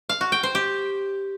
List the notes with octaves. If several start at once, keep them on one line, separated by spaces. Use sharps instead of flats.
F5
F#4
G5
C5
G4